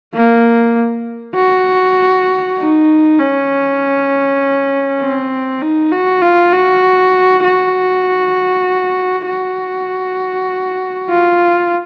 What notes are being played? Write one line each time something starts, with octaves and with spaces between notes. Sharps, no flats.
A#3
F#4
D#4
C#4
C4
D#4
F#4
F4
F#4
F#4
F#4
F4